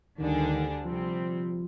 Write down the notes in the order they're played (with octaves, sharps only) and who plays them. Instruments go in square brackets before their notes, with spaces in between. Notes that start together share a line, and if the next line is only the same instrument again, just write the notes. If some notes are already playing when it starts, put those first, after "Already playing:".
[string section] D2 D3 G3 D4 G#4 [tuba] D#3
[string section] C3 G3 C4 [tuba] F3